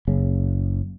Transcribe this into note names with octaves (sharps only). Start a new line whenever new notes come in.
F#1 C#3